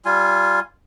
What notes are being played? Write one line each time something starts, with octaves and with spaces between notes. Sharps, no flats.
G3 F4 G#5